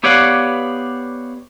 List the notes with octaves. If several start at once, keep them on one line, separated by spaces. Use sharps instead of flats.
B3 G4 C#5 D5 F5 F#5